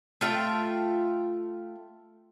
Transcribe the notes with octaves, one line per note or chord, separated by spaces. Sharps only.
A3 F4 E5 G5